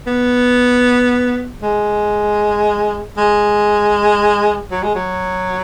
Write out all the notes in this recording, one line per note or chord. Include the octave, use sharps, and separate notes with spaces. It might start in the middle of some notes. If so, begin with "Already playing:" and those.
B3
G#3
G#3
F#3
G#3
F#3